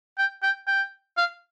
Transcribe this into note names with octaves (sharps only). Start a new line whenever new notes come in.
G5
G5
G5
F5